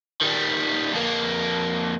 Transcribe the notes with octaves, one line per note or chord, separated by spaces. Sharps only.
D#3 G3
F2 A#3